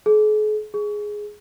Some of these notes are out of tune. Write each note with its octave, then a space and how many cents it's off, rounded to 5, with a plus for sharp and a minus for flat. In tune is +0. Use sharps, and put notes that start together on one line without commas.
G#4 +45
G#4 +5